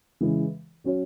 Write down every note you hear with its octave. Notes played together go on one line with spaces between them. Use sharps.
C#3 E3 G#3
F#3 C#4 F#4 C#5